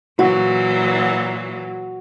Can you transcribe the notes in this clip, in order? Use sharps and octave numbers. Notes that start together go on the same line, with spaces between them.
A#2 E3 F#3 F#4